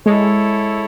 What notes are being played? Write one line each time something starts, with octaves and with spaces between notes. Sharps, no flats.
G#3 E4 A4 C#5